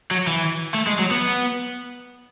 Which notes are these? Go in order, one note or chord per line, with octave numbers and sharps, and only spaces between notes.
F#3
E3
A3
G#3
F#3
B3